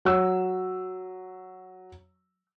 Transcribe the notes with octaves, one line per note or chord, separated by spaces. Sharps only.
F#3 E6